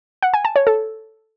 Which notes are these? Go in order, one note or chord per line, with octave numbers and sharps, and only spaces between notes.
F#5
G#5
A5
C#5
A4